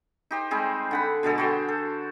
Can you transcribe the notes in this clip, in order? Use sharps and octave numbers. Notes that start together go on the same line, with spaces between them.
D#4 G4 C5
G3 G#3 C4 G#4
D3 F#5 B5
B2 D3 G#3 A4
F#4 G#4 C5 G5
A4